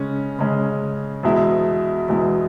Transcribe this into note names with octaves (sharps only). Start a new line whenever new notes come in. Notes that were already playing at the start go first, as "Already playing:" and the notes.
Already playing: C#3 G#3 C#4
C#3 G#3 C#4
E2 B2 G#3 E4
E2 B2 G#3 E4